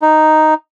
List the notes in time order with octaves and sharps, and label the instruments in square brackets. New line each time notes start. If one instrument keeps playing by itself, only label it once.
[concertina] D#4